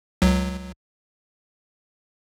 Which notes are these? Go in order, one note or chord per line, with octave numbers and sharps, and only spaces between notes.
C#2 F#3